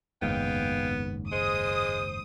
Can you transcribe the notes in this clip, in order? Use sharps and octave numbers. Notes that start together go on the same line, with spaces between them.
F#1 D#2 G#2 B3 F5 G5
G#3 C5 D#6